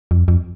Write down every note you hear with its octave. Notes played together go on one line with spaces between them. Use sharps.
F2
F2